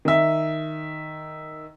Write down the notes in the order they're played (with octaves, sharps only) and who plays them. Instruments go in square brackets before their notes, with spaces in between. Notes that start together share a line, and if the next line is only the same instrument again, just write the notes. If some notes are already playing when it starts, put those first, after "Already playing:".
[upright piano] D#3 E5